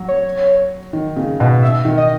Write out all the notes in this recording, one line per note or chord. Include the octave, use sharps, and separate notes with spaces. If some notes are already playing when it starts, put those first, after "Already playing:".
Already playing: F#3
C#5
D#3
C#3
B2
E5
D#3
D#5